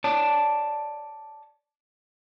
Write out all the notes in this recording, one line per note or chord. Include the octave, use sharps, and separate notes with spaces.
C#5 D5 A5